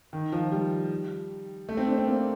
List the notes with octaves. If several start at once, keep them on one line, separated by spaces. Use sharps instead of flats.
D#3
F3
G3
A3
C4
D4
C4
A#3